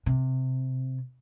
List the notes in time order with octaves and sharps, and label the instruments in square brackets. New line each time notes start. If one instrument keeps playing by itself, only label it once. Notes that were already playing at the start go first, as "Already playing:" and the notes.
[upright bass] C3